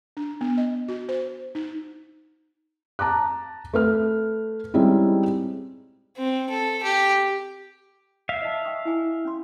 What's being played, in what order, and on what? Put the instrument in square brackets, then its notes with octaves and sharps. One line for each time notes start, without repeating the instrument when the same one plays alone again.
[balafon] D4
B3
D#5
F#4
C5
D#4
[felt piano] A5 A#5 D6 F#6
A3 B4 F6
G3 G#3 C4 C#4 D#4 E4
[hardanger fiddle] C4
A4
G4
[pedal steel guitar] E5 F5
[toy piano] D#5 A5
G5 C#6 D#6
E4 G#5 D6
C#4 C6